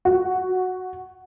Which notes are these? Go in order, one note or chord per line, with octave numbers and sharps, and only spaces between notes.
F#4